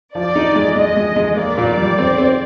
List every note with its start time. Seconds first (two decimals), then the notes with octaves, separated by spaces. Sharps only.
0.15 F3 D5
0.36 D#4
0.55 G#3
0.76 G#3 D#5
0.97 G#3
1.16 G#3
1.37 A#3 D5
1.58 A#2
1.78 G3
1.98 C4
2.18 C4